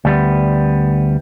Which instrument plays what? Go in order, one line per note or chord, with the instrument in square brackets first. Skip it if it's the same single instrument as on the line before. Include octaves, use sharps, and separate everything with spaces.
[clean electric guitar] D2 G3 B3